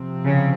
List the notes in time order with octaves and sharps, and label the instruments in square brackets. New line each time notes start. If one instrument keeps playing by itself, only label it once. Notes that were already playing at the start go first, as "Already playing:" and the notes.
Already playing: [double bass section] C3 F3 C4
[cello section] C#3